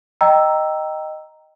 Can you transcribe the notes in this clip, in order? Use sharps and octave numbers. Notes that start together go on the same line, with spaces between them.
D#5 G5 A#5 E6